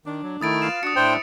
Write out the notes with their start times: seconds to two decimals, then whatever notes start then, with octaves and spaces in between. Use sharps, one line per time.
0.06 D#3 D4
0.23 F#3
0.41 D#3 A3 E4 D#6 A6 D7
0.62 F4 B4 F5 E7
0.83 D4 F#4 D#6 C#7
0.96 A2 D4 E4 C5 G5